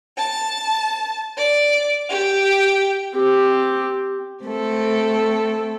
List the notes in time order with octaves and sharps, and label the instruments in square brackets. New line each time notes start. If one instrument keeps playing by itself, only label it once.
[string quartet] A5
D5
G4
[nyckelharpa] C4 G4
[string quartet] A3 C4 A4